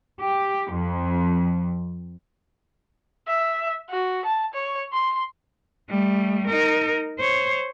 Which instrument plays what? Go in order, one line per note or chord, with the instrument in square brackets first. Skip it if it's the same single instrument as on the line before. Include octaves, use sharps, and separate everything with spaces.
[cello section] G4
F2
[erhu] E5
F#4
A5
C#5
C6
[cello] G3 A3
D#4 A#4
C5 C#5